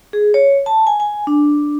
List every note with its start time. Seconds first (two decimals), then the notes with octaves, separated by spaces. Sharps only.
0.13 G#4
0.34 C#5
0.66 A5
0.87 G#5
1.00 G#5
1.27 D4